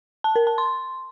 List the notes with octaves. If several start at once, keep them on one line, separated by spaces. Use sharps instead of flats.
A5
A#4
A5
C6